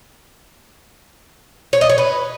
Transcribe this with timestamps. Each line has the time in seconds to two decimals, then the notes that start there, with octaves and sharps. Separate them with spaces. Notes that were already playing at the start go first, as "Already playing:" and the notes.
1.73 C#5
1.81 D#5
1.89 C#5
1.98 B4